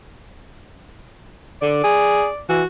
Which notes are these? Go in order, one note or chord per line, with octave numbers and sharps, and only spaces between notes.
D3 D5
G#4
E3 F#4